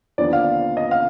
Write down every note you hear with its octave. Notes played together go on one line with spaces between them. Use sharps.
D#2 D3 F3 B3 D5
F5
D#5
F5